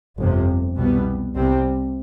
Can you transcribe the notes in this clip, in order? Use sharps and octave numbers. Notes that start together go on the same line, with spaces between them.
G1 F2 C3
C2 B2 G3 B3
C2 C3 G3 C4